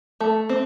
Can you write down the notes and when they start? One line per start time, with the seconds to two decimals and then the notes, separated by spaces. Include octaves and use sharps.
0.20 A3
0.49 C4